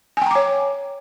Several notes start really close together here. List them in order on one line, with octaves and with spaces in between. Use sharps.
G#5 G5 A#5 D6 C#5